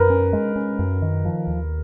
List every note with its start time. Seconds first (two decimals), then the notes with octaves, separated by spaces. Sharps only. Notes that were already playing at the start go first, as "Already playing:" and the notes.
Already playing: F#2 A#4 B4
0.10 C#4
0.33 G#3
0.56 C#4
0.79 F#2
1.02 D#3
1.25 F3
1.47 D#2